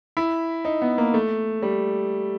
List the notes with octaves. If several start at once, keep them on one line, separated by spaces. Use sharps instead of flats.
E4
D#4
B3
A#3
A3
G3